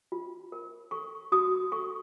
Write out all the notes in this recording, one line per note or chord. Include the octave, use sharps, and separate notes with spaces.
F4
A#4
A4 C#6
F#4 D#6
A4 C#6